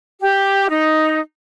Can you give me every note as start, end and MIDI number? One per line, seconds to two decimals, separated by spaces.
0.20 0.66 67
0.69 1.19 63